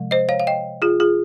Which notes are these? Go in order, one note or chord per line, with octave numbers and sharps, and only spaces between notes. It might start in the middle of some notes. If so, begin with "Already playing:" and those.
Already playing: C3 F3 G#3
C5 D#5
C#5 F5
F5
D#5 G5
F4 G#4
F4 G#4